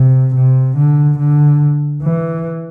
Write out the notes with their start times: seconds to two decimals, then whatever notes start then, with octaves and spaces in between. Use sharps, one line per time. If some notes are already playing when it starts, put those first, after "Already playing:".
Already playing: C3
0.35 C3
0.77 D3
1.19 D3
2.03 E3